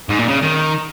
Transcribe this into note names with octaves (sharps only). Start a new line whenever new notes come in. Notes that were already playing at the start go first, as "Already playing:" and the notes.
G#2
A#2
C#3
D#3